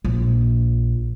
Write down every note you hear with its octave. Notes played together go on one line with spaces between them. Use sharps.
A#1